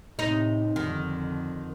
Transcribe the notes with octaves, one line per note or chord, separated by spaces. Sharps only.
A2 C3 D#4
F2 D3 D#3